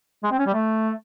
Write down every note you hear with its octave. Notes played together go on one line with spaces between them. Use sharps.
G#3
C4
C#4
G3
A3